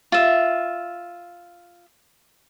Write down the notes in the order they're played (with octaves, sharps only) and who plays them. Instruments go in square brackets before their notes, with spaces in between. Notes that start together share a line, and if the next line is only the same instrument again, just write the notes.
[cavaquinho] F4 E5